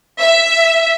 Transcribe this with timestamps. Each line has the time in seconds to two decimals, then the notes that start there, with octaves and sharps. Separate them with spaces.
0.21 E5